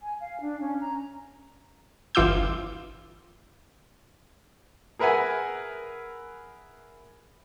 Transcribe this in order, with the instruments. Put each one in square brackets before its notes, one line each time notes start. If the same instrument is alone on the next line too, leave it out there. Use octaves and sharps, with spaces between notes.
[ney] G#5
F5
D4
C#4
A#5
[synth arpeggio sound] G1 E3 F4 D6 E6 G6
[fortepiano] G#4 A#4 B4 E5 F#5 G#5